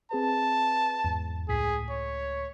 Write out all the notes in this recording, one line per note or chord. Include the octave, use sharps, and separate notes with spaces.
C4 G#4 B4 A5
E2 G#2
C#2 A2 G#4 B6
C#5